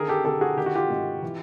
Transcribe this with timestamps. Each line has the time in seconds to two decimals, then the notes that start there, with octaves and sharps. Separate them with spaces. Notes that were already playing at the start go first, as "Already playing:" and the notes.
Already playing: D3 D#3 G#4 A#4
0.08 G4 A4
0.25 D3 G4 A4
0.41 F#4 G#4
0.57 D#3 G4
0.66 F#4
0.75 F4 G4
0.90 G#2
1.22 E3